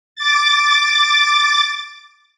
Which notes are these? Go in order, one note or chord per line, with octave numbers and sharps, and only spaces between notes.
D6 A6